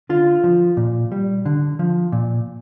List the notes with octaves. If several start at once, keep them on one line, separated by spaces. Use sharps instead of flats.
D3 F4
F3
A#2
G3
D3
F3
A#2